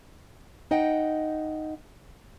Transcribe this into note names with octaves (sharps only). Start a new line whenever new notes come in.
D#4 D#5 F#5 G5